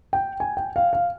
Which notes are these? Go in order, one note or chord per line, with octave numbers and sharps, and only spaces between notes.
G5
G#5
G5
F5
F5